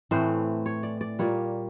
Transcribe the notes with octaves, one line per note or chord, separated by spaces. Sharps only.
A2 E3 A3 C4 C5
C#5
D5
D5
A#2 G3 A#3 C#5